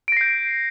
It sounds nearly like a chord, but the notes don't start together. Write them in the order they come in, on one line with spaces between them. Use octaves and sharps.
D7 A#6 C7 G6